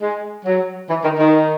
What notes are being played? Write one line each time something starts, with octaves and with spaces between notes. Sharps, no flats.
G#3
F#3
E3
D#3
D#3